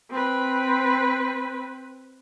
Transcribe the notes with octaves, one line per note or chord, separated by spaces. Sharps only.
C4 B4